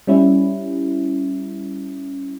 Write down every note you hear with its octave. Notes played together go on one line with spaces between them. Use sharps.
G3 C#4 E4